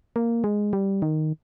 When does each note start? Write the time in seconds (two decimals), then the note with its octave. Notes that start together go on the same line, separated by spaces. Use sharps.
0.16 A#3
0.44 G#3
0.73 G3
1.02 D#3